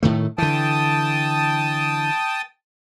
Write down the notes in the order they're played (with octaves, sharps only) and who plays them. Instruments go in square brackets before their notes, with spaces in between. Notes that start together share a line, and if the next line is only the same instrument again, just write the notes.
[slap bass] A2 D#3 A3
[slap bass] D3 E3 [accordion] G5 A5 D#6